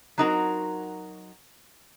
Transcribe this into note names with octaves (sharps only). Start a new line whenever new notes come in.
F#3 C4 D#4 F#4 A#4